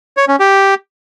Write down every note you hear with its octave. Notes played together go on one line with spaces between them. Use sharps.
C#5
C#4
G4